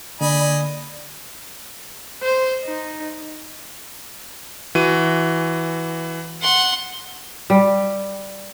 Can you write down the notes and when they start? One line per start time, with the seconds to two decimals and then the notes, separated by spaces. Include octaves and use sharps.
0.21 D3 A#3 D5 D#5 G#5 B5
2.23 C5
2.65 D#4
4.75 E3 F#4 D#7
6.41 F#5 C6
7.50 G3